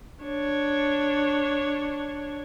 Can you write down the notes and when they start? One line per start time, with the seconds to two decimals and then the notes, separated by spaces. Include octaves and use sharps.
0.24 D4 C#5